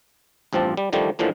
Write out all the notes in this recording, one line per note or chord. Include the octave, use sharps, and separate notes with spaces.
A1 G2 F3 C4 A5
G3
D3 D#3 F3 G3 A3
A2 D3 E3 F3 A#3